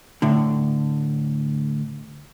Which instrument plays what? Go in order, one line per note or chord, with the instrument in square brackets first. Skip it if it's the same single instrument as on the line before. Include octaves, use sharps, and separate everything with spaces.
[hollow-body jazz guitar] A2 D3